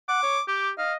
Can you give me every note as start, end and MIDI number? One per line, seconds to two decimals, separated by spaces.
0.09 0.22 78
0.09 0.43 86
0.23 0.38 73
0.48 0.70 67
0.48 0.70 86
0.78 0.97 75
0.78 0.93 77